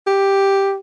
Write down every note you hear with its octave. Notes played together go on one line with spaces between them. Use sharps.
G4